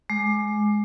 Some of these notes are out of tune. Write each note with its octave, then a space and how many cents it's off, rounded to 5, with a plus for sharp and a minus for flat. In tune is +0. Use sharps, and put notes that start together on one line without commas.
G#3 +15 D6 +20